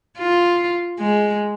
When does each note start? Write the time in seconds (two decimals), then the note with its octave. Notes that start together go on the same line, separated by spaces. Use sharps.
0.18 F4
0.99 G#3